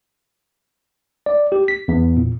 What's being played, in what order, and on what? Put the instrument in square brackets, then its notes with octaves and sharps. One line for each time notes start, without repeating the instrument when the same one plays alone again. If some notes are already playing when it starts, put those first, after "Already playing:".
[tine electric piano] D5
G4
B6
E2
A#2